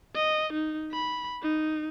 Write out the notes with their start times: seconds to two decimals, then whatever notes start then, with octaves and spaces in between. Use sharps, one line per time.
0.16 D#5
0.53 D#4
0.92 B5
1.42 D#4